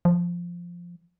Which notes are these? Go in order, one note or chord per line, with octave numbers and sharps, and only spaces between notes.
F3